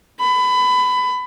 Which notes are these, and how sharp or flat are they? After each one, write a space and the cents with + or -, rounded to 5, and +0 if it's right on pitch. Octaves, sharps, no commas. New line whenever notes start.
B5 +25